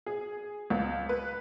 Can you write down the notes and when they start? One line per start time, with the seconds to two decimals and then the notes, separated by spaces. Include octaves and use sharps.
0.06 G#4
0.70 C#2
1.09 B4